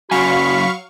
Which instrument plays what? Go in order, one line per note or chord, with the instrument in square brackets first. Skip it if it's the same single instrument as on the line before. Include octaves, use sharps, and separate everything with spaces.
[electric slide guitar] F#2 C#3 G#5 [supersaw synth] F#3 F5 C#6 [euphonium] F#4 [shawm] B5